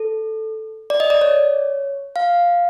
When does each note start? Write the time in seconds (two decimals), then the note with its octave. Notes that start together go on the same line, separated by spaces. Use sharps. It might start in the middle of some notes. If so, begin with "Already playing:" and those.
Already playing: A4
0.90 D5
1.00 D#5
1.10 D5
1.21 C#5
2.16 F5